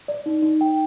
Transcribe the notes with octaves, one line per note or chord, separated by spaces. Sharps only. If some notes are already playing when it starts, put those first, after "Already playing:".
D5
D#4
D#4
G5